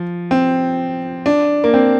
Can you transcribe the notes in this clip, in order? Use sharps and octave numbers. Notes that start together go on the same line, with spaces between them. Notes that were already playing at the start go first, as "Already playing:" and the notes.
Already playing: F3
C4
D4
A#3
C4